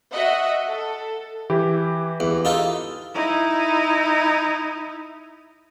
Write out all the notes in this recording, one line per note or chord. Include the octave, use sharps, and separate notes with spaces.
F#4 D#5 E5 F#5
A4
E3 E4 G4
E2
D#4 F4 A4
D#4 E4